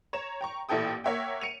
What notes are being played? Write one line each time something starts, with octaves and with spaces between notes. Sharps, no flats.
C#5 A#5 E7
G5 A#5 C#6
A1 A#2 E4 A4 G5 D#6
A#3 C#5 E5 F#5 G5
C#7 D#7 F7